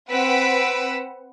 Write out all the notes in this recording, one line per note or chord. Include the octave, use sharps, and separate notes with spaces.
C4 B4 F#5 E6 B6 D7